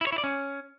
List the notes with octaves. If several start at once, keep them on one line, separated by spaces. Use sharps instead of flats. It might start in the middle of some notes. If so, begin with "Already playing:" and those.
E4
C#5
E4
D5
C#4